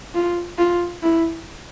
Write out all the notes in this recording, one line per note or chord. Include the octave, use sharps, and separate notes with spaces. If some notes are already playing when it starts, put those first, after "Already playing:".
F4
F4
E4